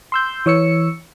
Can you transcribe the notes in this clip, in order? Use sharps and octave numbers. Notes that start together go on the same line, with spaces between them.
C6 E6 G6
E3 C#5 E6 C#7